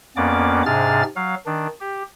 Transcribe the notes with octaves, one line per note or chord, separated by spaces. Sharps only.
F2 A#3 B3 C#4 D5 D6
G#2 C3 D4 G#4 F6 A6
F#3 F5
D#3 D4
G4